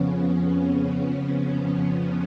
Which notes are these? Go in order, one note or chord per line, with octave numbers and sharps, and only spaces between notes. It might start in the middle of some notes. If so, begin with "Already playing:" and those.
Already playing: F2 C#3 F3 B3 C#4
B3